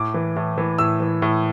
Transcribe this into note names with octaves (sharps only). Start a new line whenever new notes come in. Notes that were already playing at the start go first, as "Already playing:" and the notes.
Already playing: A2 D6
E3
A2
E3
A2 E6
E3
A2